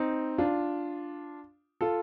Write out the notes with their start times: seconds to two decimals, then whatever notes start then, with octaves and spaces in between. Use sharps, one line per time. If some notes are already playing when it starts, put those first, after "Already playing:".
Already playing: C4 D#4
0.38 D4 F4
1.81 F4 A4